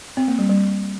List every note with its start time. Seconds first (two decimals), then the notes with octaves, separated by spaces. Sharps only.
0.17 C4
0.28 A#3
0.39 G3
0.49 G3